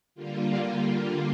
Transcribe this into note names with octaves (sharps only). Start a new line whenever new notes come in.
D3 G3 A#3 F4
F4